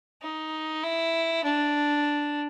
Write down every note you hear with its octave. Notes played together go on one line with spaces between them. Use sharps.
D#4
E4
D4